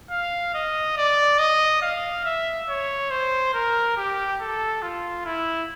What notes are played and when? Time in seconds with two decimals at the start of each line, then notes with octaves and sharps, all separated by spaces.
0.11 F5
0.54 D#5
0.97 D5
1.39 D#5
1.82 F5
2.25 E5
2.69 C#5
3.11 C5
3.54 A#4
3.97 G4
4.41 A4
4.82 F4
5.25 E4